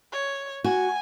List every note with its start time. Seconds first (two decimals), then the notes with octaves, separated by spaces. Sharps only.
0.12 C#5
0.64 F#4 G#5